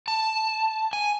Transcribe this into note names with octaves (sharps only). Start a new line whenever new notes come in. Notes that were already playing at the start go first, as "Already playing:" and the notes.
A5
G#5